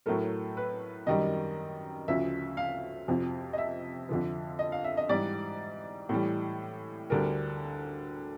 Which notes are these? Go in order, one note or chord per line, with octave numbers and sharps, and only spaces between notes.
A2 F#3 A3 A#4
B4
F#2 D#3 G3 D#5
D2 C#3 F3 E5
F5
F2 C3 F3
D#5
E5
F2 D3 F3
D#5
F5
E5
D#5
G#2 E3 G3 D5
A2 E3 G3
D2 D3 G3 A#4